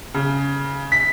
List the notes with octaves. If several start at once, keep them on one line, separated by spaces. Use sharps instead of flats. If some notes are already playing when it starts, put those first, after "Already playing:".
C#3
B6